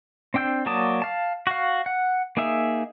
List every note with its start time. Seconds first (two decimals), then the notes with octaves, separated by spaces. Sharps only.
0.34 C4 D4 G5 E6 G6
0.66 F#3 A#3 D5 A5 D#6
1.02 F5 A5
1.47 F#4 F5
1.86 F#5
2.37 A#3 D#4 G#4 E5